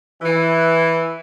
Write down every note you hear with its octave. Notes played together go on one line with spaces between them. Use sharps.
E3